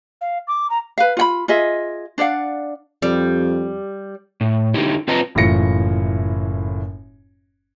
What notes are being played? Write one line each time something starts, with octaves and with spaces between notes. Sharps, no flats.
F5
D6
A#5
B4 F5
F4 F#5 B5
F4 G#4 D#5 E5
D4 D5 F5 F#5
F2 G3
A2
D3 D#4 E4 G4
C4 F4 B4 D#5 A5 A#5
F#1 A2 E3 F4 A#6 C#7